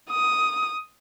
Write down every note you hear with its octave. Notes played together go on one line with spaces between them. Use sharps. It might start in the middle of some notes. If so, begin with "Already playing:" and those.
D#6